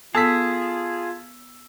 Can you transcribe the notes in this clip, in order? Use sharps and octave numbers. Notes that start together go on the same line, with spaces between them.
B3 F4 G#4 A4 A5 E6 B6